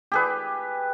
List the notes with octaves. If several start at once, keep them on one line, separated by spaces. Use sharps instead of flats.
G4 G#4 B4